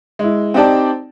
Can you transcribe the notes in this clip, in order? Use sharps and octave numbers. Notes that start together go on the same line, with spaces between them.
G#3 E4
C4 D#4 G4 D5 A5